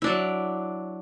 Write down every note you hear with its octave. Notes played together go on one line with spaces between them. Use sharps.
F#3 D4 E4